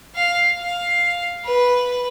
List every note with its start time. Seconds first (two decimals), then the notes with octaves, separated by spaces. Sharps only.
0.15 F5
0.62 F5
1.45 B4